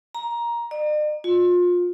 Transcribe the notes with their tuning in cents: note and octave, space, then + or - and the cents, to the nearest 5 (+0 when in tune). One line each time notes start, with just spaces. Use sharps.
A#5 +15
D5 +45
F4 +30